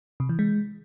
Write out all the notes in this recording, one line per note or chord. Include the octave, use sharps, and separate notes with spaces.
C3
E3
G#3